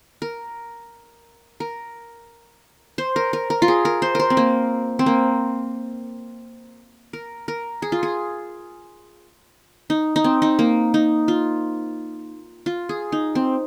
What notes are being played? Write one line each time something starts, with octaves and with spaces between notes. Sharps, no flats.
A#4
A#4
C5
A#4
A#4
A#4
F4
G#4
A#4
C5
A#4 C5
C4
A#3
C4
A#3
A#4
A#4
G#4
F4
G#4
D#4
D#4
C4
D#4
A#3
D#4
F4
F4
G#4
D#4
C4